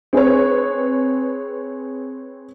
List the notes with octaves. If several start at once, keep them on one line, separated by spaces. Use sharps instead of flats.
C4 G#4 B4 C#5